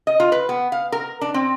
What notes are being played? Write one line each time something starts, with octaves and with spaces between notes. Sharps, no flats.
D#5
F4
B4
B3
F5
A#4
D4
C4